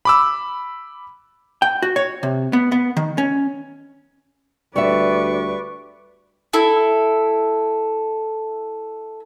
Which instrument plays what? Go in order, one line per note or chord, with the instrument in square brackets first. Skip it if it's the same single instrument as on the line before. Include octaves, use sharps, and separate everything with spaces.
[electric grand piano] B5 D6 E6
[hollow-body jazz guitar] G5
F#4
C#5
C3
B3
B3
D#3
C#4
[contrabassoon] D2 [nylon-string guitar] G3 E5 [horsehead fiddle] B4 D5 [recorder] C#6
[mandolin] E4 A4